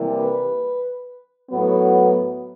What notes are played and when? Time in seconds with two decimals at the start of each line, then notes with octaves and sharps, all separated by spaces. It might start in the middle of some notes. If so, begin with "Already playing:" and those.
Already playing: C3 E3 G3 A#3
0.16 B4
1.50 A2 F#3 B3